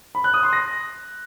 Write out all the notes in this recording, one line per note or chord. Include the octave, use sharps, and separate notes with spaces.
B5
F#6
D#6
C6
A#6